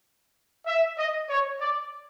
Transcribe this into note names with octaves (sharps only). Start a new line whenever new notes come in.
E5
D#5
C#5
D5